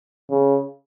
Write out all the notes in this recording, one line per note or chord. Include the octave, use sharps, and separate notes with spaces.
C#3